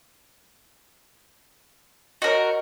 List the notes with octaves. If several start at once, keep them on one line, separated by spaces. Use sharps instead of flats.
F#4 A#4 C#5 D#5